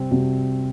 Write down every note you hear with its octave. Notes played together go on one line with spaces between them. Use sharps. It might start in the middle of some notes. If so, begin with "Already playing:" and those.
Already playing: C3 G3 C4
C3 G3 C4 F#4